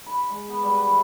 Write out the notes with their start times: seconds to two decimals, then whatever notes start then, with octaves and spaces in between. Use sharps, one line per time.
0.06 B5
0.30 G#3
0.49 B3
0.63 G3
0.75 B4
0.88 E3